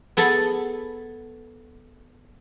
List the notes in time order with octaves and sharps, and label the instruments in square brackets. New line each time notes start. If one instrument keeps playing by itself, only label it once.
[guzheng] B3 G#4 A4